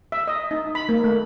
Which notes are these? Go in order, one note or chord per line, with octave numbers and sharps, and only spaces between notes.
E5
D#5
D#4
B5
A#3
A3